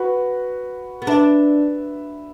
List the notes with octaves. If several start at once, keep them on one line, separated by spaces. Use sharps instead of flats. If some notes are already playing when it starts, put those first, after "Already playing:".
Already playing: F#4 B4
B3
D4 B4 E5